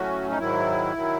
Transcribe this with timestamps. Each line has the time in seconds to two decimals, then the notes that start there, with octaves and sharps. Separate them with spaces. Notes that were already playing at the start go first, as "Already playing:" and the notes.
Already playing: A2 F#3 A3 C#4 F#4
0.30 D#4
0.38 G#2 D#3 F#3 E4
0.96 D#3 F#3